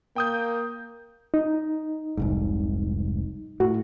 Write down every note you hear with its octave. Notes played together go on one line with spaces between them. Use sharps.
A#3 G5 D#6 G6
D#4
F1 C2 G#2
A2 F#4